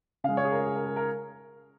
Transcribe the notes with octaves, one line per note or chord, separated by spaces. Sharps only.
C#3 G#3 F5
C#5
G#4
A#4
G#4
A#4
A#4
A#4